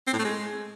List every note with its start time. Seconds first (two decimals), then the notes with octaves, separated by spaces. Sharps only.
0.07 C4
0.13 A2
0.19 A3
0.25 G#3